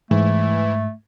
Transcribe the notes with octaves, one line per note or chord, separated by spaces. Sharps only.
G#2 E3 A3